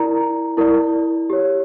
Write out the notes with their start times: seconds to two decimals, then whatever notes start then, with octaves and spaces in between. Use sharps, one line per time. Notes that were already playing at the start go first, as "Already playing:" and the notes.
Already playing: E4 A#4 D5 A#5
0.57 E4 A#4 D5
1.30 G4 C#5